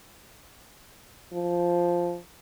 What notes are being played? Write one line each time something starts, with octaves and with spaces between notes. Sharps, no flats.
F3